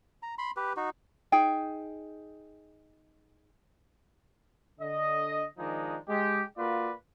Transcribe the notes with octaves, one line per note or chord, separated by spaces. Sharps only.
A#5
B5 C6
G4 B4
D#4 F#4
D#4 G#4 G5
D3 D#5
D#3 F3 G#3 D4 D#4
G#3 G4
A#3 F4 F#4 B4 D5